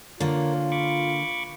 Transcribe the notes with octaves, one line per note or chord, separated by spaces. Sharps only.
D3 A#3 F4 A#4 C#5
B5 C#6 D6